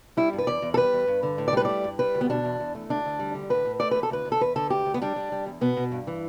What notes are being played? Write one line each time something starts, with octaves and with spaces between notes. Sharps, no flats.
G3 E4
G2
B4
E2 D5
E2
A4
G3 B4
E2
G2
D3
A2
D5
G3 B4
A3 D5
G2
G3 B4
D2
B3
B2 D4
E2
E2
A3
D2 D4
D2
G3
D3
A2 B4
A2
A3 D5
E2 B4
A4
D2 B4
D2
A4
E2 B4
D3 A4
D2 G4
D2
B3
G3 D4
G3
G3
E2
B2 B3
B2
G2
E3